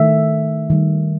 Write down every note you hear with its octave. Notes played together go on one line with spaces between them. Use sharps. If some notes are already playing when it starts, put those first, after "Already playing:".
Already playing: D#3 A3 E5
D#3 G3